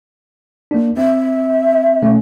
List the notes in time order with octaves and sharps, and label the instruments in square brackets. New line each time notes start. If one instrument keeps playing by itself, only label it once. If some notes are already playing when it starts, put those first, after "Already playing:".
[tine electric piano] A#3 D4
[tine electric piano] C4 [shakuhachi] E5
[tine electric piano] B2 A3 C#4